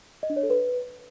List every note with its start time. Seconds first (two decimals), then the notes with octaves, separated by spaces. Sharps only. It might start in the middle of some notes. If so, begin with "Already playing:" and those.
0.23 D#5
0.30 D4
0.36 C#5
0.43 A4
0.50 B4